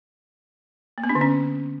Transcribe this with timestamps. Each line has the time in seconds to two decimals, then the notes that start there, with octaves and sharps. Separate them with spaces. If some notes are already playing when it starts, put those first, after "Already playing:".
0.98 A#3
1.04 B3
1.09 D4
1.15 D3
1.21 C#4